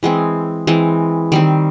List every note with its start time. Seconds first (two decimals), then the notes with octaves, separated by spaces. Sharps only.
0.03 E3 G#3 C4
0.67 E3 G#3 C4
1.32 D#3 G3 C4